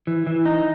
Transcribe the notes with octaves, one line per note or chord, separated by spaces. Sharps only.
E3
E3
D#4